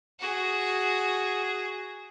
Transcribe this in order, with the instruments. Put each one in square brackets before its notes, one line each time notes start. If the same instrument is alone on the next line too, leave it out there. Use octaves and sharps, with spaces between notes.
[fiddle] F#4 G#4